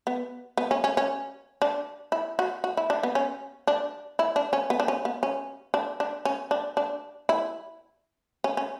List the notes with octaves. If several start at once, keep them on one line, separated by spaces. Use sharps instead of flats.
B3
B3
C#4
C#4
C#4
D4
E4
F#4
F#4
E4
D4
B3
C#4
D4
E4
D4
C#4
B3
D4
C#4
B3
C#4
D4
D4
C#4
D4
D4
E4
C#4
C#4